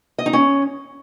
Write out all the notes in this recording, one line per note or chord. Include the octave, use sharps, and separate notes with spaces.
D#5
D#4
C#4